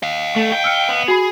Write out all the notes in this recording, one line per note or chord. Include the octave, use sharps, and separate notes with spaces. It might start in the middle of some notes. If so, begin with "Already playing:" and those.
D#5 F5
A3
G5
E6 F6 C#7
B3
F#4 G#4 B5